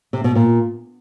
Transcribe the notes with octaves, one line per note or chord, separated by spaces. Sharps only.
C3
B2
A#2